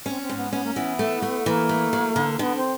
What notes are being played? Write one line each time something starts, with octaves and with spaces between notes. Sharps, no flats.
C4 C#4
C4
G#2
B3
B3 C#4
A#3
E3 B3
A3
A3
E3 A#3
A3
F#3
D3
D3 B3
C4